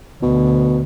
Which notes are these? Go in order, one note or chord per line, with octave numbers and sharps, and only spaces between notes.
D2 B2